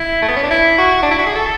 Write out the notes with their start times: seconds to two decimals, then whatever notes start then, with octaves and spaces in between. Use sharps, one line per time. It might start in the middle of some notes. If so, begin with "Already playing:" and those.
Already playing: E4
0.22 A3
0.28 B3
0.36 C#4
0.43 D4
0.51 E4
0.78 F#4
1.03 D4
1.11 E4
1.19 F#4
1.26 G#4
1.35 A4